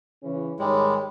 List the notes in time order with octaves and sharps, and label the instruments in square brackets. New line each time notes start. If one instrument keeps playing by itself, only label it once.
[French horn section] C#3 E3 C#4
[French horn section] G#2 D#3 C#5 [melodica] G3 G#3